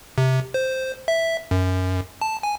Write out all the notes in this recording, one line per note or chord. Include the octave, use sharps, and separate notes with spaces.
C3
C5
E5
F#2
A5
G#5